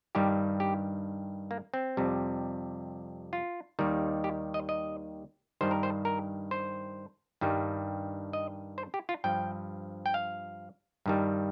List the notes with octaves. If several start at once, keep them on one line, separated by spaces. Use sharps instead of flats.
G2 D#3 G3 G4
G4
A#3
C4
F2 C3 G3
F4
D#2 D#3 G3
G4
D#5
D#5
G2 D#3 G3 C5
A#4
C5
A#4
C5
G2 D#3 G3
D#5
C5
G4
F4
G2 F3 G5
G5
F5
G2 D#3 G3